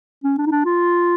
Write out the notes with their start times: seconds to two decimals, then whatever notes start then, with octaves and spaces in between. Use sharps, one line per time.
0.24 C#4
0.38 D4
0.46 D#4
0.52 D4
0.65 F4